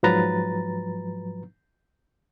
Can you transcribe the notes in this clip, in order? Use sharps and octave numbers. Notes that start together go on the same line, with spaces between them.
G#2 F3 F#3 B4 A#5 A6